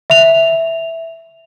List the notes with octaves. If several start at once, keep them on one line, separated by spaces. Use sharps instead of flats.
E5 F7